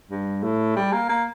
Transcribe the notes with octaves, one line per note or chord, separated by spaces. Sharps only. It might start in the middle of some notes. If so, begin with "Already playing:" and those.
G2
A2
G3
A#3
A#3